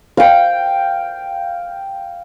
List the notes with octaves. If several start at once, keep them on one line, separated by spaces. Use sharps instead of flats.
F5 G5